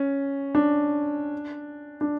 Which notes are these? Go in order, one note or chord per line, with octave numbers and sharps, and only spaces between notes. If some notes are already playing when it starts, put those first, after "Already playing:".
Already playing: C#4
D4
D4